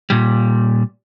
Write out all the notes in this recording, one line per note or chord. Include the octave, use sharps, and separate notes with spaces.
A#2 G3